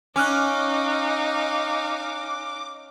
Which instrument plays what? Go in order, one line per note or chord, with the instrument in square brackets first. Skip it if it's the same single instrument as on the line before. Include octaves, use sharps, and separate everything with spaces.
[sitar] C#4 [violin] D#4 F5 [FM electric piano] G#5 F6 F#6 [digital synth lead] D6